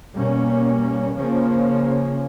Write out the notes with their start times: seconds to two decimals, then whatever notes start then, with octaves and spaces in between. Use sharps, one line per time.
0.14 B2 G3 A#3 C#4
1.16 C#3 F3 A#3 C#4